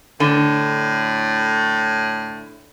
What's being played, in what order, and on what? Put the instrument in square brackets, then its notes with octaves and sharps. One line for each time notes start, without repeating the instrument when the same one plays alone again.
[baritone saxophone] A2 [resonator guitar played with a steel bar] D3